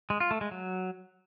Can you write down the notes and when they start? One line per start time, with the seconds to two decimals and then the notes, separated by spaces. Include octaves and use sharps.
0.10 G#3
0.20 F4
0.31 A3
0.41 G#3
0.51 F#3